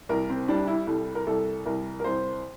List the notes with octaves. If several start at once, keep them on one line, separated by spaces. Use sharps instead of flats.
C2 A#4
C4
G3 D4
E4
C2 A4
A#4
C2 A4
C2 A#4
A#4
C2 C5